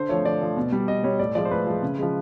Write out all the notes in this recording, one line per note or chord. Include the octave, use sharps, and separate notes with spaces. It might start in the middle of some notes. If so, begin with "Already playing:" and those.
Already playing: D3 C5
F3 A3 C#5
D3 D5
F3 A3
B2
G3
B2 D#5
G3 C#5
A2 D5
F3 G#3 D5
C5
A2 B4
F3 G#3
C#3
F3 G#3